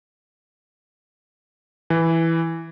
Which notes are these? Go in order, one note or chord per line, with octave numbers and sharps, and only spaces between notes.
E3